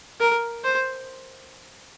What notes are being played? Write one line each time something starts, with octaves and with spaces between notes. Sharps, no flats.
A#4
C5